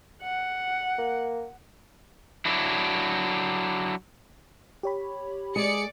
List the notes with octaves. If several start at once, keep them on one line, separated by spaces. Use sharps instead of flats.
F#5
A#3
F#3 D4 E4
G4 C#5 B5
G#3 G#4 D5 G#5 C#7